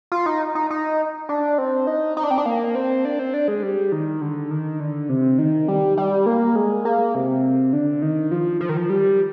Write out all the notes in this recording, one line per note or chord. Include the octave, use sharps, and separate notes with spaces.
F4
D#4
D#4
D#4
D4
C4
D#4
D#4
D4
C4
D4
A#3
C4
D4
C4
D4
G#3
G3
D#3
D3
D#3
D3
C3
D#3
G3
G3
A#3
G#3
A#3
C3
D3
D#3
F3
F3
D#3
F3
G3